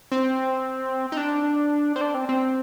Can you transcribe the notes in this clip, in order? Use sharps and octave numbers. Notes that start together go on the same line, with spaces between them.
C4
D#4
D4
C4
D4
C4
C4